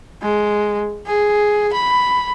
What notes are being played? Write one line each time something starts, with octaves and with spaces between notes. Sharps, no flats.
G#3
G#4
B5